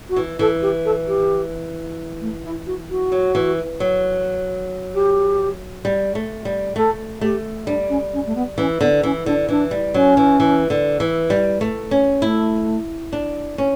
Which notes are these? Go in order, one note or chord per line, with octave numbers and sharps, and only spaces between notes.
F#4
E3
E3 A4
G4
A4
G4
A3
E4
F#4
F#4
F#3
E3
F#3
G4
G3
A3
G3
A3 A4
A3 G4
G3 D4
C#4
C#4
A3
B3
E3 C#4
D3 B3
E3 C#4
D3 D4
E3 D4
G3
F#3 C#4
E3
E3
D3
E3
G3
A3
C#4
A3 E4
D4
C#4